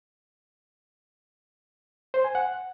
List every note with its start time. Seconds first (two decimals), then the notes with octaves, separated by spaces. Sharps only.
2.14 C5
2.24 G#5
2.35 F#5